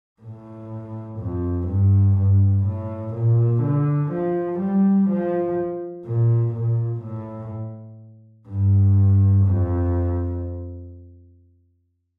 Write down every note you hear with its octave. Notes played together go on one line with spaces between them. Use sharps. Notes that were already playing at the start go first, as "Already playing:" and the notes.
A2
F2
G2
G2
A2
A#2
D3
F3
G3
F3
A#2
A#2
A2
G2
F2